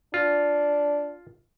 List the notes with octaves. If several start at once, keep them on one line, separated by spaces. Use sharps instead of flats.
D4 F4